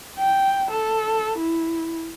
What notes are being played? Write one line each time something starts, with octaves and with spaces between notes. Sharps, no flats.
G5
A4
E4